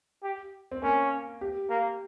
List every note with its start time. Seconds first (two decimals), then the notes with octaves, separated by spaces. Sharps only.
0.23 G4
0.72 C4
0.82 A#3 C#4
1.41 G4
1.70 A#3